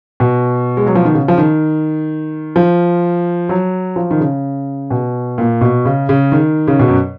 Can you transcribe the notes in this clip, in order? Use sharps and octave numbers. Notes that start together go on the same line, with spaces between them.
B2
G#3
F#3
F3
D#3
C#3
F3
D#3
F3
F#3
F3
D#3
C#3
B2
A#2
B2
C#3
C#3
D#3
C#3
B2
F#2